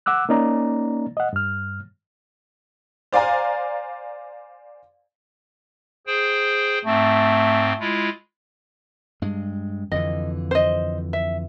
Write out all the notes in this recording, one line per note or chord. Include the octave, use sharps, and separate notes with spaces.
F#5 D6 E6 F#6
A#3 C#4 D#4 D5 A#5
D#5 F#5
G2 F6
C5 D5 F5 G#5 A#5
G#4 C5 G5
G#2 A3 C4
G#3 E4 F4
G2 G#3
F2 D3 E3 D#5
C5 D#5
E5